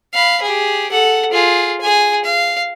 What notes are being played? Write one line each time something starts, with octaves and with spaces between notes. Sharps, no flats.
F5 B5
G4 G#4
A4 F#5
F4 G#4
G#4 G#5
F5